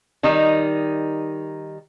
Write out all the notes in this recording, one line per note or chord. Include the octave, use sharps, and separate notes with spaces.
D#3 G3 D#4